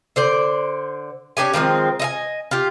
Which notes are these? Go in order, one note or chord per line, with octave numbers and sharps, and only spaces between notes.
D3 C5 D5
C#4 D4 G4 G#5
D#3 F3 G#3 C4
D#5 E5 G#5
F4 G4